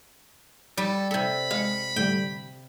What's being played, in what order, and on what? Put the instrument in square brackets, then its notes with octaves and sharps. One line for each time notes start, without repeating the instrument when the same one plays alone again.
[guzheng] G3 [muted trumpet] A4
[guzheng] C3 A4 [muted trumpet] B5
[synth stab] G#3 C#7 [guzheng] F5
[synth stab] A2 D3 G3 [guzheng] G5